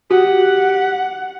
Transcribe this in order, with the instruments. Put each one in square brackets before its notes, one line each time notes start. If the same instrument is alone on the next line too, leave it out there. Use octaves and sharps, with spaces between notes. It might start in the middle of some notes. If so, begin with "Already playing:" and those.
[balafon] F#4 [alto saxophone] G4 [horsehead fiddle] F#5